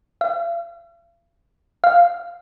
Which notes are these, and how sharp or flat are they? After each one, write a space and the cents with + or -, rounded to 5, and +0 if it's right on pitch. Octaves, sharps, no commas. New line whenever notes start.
F5 -45
F5 -5